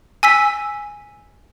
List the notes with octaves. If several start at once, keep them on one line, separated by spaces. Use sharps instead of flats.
G#5 E6 B6